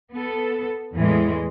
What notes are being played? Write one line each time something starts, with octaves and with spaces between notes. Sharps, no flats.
B3 A4
E2 A2 E3 G#3